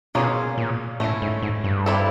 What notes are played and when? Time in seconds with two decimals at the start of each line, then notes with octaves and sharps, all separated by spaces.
0.15 B2 A#3 C#4 F4 G#4 C#5
0.58 A#2
1.00 A2 A3 C#4 E4
1.22 G#2
1.42 G#2
1.64 G2
1.86 G3 C4 E4 A4